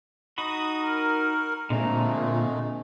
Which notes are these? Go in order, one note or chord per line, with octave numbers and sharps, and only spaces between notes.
D#4 F#4 B5 D#6
A#4
A#2 D3 G#3 A3 C4 A#5